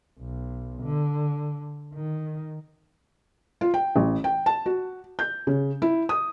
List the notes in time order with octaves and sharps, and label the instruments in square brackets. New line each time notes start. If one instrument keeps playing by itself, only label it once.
[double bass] B1
D3
D#3
[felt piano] F4
G5
A1
G5
A5
F#4
G6
C#3
E4
D#6